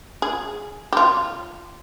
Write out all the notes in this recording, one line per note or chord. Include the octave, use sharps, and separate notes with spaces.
G#4
G4
F4